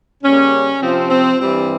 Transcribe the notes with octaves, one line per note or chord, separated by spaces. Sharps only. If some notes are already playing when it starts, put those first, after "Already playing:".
C#3 G3 A#3 C#4
C3 F3 C4
C4
G2 E3 G3 C4